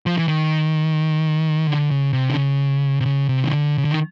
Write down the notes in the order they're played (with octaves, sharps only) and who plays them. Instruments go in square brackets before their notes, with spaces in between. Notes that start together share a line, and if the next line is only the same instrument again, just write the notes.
[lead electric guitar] F3
E3
D#3
D3
C#3
C3
D3
C#3
C3
C#3
C3
D#3
D3
C#3
D3
D#3